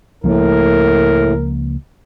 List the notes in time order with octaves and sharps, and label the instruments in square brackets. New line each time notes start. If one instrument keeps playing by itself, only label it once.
[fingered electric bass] C#2 F3 A#3 [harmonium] A2 [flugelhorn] A#4